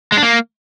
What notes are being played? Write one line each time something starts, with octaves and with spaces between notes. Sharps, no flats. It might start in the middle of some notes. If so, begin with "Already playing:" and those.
G#3
D4
A#3